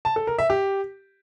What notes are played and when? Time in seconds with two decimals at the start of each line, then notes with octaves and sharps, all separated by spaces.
0.05 A5
0.16 A4
0.27 A#4
0.38 E5
0.50 G4